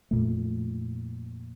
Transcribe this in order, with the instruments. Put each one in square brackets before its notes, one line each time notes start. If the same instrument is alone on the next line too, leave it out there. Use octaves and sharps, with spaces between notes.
[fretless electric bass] F2 A#2 A3